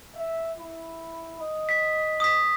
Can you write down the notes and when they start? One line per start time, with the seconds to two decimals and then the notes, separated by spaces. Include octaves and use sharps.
0.15 E5
0.57 E4
1.40 D#5
1.69 B6
2.20 D#6 B6